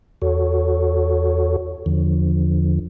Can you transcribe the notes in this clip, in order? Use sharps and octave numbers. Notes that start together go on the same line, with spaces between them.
E2 F#4 A4 C#5
E2 D3 F3